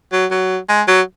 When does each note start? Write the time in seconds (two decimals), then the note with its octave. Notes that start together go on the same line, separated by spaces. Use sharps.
0.12 F#3
0.31 F#3
0.69 G#3
0.88 F#3